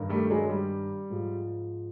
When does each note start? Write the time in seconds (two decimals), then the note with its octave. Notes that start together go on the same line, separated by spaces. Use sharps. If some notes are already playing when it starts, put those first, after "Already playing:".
Already playing: G2 D#3
0.09 G3 A3
0.30 F#3 G#3
0.50 G3
1.10 G#2 F3